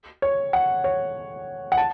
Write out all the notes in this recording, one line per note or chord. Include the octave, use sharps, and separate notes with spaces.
C#5
F#5
C#5
F#5
A5